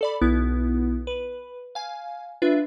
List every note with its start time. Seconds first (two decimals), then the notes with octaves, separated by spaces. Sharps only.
0.01 A4 D5 B5
0.22 B1 B3 E4
1.07 B4
1.75 F5 G#5
2.42 D4 F4 B4 E5